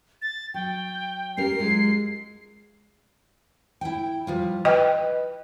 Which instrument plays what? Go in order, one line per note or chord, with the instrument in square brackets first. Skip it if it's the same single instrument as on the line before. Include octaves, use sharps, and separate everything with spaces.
[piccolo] A6
[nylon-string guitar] F#3 [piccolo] G5
[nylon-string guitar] C#4 G4 A#4 [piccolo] C7
[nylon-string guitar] F#3 G#3 F4
[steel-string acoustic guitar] E4 G5
F3 G3 F4
[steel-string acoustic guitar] B4 [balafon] D#5 G5